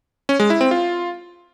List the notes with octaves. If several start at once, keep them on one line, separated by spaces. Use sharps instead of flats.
C#4
G#3
E4
C4
F4